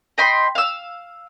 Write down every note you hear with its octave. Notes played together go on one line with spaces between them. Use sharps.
D#5 G5 B5 C6
F5 E6